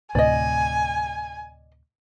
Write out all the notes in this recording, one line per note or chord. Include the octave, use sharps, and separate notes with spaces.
D2 A2 C3 D5 D#5 G#5